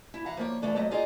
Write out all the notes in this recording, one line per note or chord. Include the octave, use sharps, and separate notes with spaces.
E4
E3 F5 F#5 A#5
F3 A#3 C#5
E3 F3 A3 D4
F2 F#3 A3 D#5
D#4 F4 G#4 A#4 D5 D#5